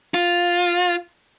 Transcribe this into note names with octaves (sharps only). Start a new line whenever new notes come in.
F4